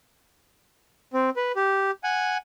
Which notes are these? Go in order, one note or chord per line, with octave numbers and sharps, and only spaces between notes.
C4
B4
G4
F#5 G#5